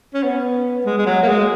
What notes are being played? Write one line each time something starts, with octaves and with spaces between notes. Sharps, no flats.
C#4
B3
G#3
G#3
F#3
A#3
G#3